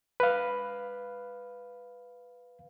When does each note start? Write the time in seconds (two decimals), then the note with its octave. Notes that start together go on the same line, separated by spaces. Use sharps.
0.20 B4 F5